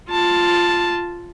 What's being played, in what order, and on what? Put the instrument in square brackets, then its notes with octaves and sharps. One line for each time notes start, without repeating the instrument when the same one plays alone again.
[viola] F4 A5